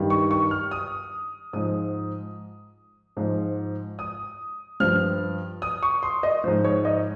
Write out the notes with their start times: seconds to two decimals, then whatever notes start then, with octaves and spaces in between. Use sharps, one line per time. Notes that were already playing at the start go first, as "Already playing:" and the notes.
Already playing: G2 D#3 G3
0.10 C#6
0.31 C#6
0.51 F6
0.71 D#6
1.53 G#2 F3 D#6
3.17 G#2 F3
3.99 D#6
4.80 G2 F3 F6
5.62 D#6
5.83 C#6
6.03 C6
6.23 D#5
6.44 G#2 F3 C5
6.64 C#5
6.85 D#5